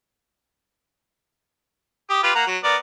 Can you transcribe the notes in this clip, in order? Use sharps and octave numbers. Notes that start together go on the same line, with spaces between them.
G4 D#6
F4 G4 B4
A#3 F#5 A#5
F#3
B3 A#4 D5